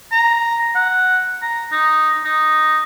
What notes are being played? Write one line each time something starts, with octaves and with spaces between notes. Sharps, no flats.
A#5
F#5
A#5
D#4
D#4